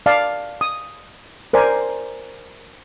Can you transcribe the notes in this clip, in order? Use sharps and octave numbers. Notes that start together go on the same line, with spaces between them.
D5 F5 A5
D#6
A#4 C5 D5 G#5